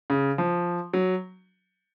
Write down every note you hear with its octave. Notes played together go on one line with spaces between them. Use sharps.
C#3
F3
F#3